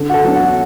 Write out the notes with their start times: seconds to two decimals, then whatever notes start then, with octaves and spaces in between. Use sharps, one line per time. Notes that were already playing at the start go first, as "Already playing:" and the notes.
Already playing: D3
0.10 F#4
0.14 A4
0.24 F#3 B3 D4
0.35 F#4